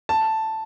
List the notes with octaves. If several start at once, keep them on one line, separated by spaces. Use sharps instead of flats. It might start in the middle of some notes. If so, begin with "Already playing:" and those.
A5